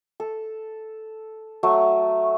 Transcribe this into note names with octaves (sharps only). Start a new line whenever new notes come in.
A4
F#3 A3 C#6